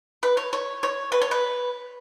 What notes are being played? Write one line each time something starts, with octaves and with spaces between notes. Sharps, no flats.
B4
C#5
C#5
C#5
B4
C#5
B4